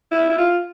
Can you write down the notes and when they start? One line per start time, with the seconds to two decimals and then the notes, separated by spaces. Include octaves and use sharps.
0.12 E4
0.29 E4
0.38 F4